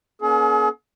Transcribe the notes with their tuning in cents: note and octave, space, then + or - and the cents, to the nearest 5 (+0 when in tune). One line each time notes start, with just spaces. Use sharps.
A#3 +45 C#4 +20 G#4 +45